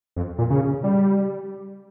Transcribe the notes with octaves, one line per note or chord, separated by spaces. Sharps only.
F2
A#2
C#3
G3